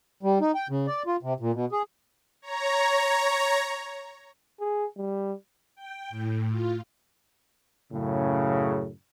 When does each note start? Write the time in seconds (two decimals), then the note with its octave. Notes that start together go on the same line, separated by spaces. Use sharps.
0.23 G3
0.41 D#4
0.55 G5
0.69 C#3
0.87 D5
1.07 F4
1.23 C3
1.40 A#2
1.54 B2
1.72 G#4
2.42 C#5 A#5
4.60 G#4
4.97 G3
5.76 G5
6.10 A2
6.50 F4
7.92 F#2 A2 C#3